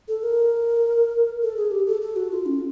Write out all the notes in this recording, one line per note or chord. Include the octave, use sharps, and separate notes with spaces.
A4
A#4
A4
G#4
G4
A4
A4
F#4
F4
C#4